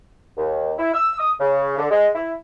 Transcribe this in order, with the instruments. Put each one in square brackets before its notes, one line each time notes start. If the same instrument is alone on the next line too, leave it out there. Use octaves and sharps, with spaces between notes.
[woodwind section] D#2
E4
E6
D#6
C#3
D3
G#3
E4